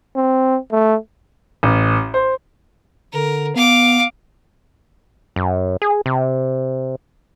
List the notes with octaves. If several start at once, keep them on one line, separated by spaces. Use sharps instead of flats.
C4
A3
A1
C5
D3 A#4
B3 F5 D6
F#2
G#4
C3